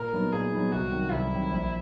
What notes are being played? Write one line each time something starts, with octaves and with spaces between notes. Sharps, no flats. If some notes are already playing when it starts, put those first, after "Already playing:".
Already playing: A#2 A#4
F#3 B3 D#4
A#2 G#4
F#3 B3 D#4
C2 F#4
C3 D#3 F#3
C2 E4
C3 D#3 F#3
A#1